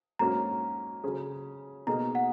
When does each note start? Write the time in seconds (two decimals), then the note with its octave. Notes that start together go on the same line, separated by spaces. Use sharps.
0.19 G#2 F#3 A#3 C#4 F#4 A#5
1.04 C#3 F#3 C#4 G#4
1.87 B2 A#3 D#4 G#4 A#5
2.15 F#5